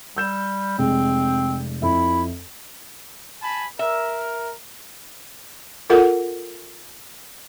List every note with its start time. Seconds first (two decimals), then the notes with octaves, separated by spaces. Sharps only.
0.17 G3 E6 G6 E7
0.79 F1 G#3 C4
1.82 F2 E4 E5
3.41 G#5 A5 B5
3.79 A#4 E5
5.90 F4 A4 A#4 F#5